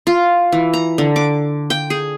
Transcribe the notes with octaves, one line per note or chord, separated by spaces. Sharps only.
F4
E3
A#5
D3
D6
G5
G#4